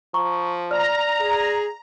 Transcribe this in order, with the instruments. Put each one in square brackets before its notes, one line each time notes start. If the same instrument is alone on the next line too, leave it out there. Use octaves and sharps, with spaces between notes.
[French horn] F3 [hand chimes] A#5 C#6
[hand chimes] D5 F6 [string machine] A#5
[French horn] G#4